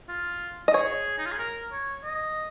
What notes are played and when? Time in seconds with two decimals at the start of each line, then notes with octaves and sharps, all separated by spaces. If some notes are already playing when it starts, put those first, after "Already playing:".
0.09 F4
0.68 D#5
0.74 G#4 C#5
1.18 D#4
1.26 F4
1.32 G#4
1.39 A#4
1.72 C#5
2.04 D#5